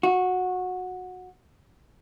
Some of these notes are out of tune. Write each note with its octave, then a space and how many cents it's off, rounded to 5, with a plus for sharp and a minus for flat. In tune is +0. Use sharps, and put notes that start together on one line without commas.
F#4 -15